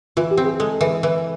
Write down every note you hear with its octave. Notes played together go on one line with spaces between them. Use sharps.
E3 F4
G4
C4
G#4
G#3 A4
E3
E3